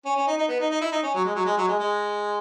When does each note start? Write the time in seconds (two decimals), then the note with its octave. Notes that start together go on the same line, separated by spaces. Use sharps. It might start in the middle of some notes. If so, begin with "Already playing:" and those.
0.05 C#4
0.16 C#4
0.27 D#4
0.38 D#4
0.48 B3
0.60 D#4
0.71 D#4
0.81 E4
0.92 D#4
1.03 C#4
1.14 F#3
1.25 G#3
1.35 F#3
1.46 G#3
1.58 F#3
1.68 G#3
1.79 G#3